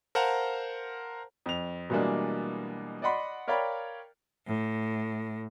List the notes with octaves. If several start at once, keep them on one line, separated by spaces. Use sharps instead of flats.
A#4 C5 F5 F#5 A5 A#5
F2 F7
B2 E3 G3 G#3 A#3 D4
D5 D#5 F#5 B5 C6
A#4 C#5 D5 F5 G5 B5
A2